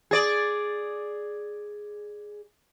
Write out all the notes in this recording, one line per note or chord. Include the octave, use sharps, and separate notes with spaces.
G#4 D5